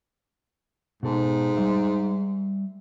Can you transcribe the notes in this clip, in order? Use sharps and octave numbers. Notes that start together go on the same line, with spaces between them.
G#2 B2 A4
G3 E5